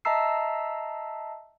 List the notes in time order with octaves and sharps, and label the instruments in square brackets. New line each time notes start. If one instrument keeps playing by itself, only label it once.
[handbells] D#5 E5 A5 A#5 E6 C7